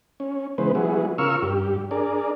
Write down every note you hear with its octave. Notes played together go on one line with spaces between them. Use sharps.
C#4
C#3 E3 G#3 B3 B4 C5
F3 G3 B3 E4 F#4 G#4
C#3 F4 A#4 C#6 E6 F6
G2 G4
D4 G#4 A#4 D5